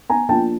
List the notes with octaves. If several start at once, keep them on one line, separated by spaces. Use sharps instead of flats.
G#5 A#5
F3 A#3 D4 F4 G5 A5